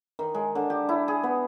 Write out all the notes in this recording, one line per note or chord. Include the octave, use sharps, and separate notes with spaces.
D#3
G#3
D3
G4
E4
G#4
B3